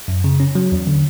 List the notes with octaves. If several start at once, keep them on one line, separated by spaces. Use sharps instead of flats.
F#2
C#3
C#4
F#3
E2
D3